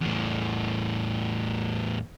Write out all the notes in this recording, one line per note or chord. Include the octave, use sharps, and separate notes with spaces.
E2 A2